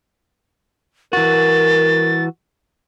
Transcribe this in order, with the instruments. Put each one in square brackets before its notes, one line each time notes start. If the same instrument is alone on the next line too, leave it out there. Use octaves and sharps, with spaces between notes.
[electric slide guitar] E3 F#4 [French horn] A#4 [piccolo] A6